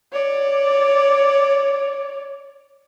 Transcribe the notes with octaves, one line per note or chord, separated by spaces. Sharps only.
C#5 D5